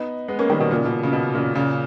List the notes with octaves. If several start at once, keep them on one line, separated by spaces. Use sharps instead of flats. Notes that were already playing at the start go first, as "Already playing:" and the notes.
Already playing: B3 D#4
G#3 B3
A#3 C#4
D#3 G3
B2 D#3
A#2 C#3
B2
C#3
B2
A#2 C#3
A#2 C#3